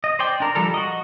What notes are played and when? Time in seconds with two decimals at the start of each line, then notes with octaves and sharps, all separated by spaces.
0.04 D#5
0.19 C5 D5 G5
0.40 D4 A#4
0.55 F3 G3 A4 A#4
0.74 F#4 D#5